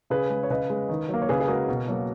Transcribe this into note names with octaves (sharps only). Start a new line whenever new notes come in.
C#3 G#4 B4
G#3
C#5
C#3 B4 D#5
G#3
D#3
F#3 A#3
C#5
C#3 G#4 B4
G#4
G#3 F#4 A#4
B2
F#3 A#3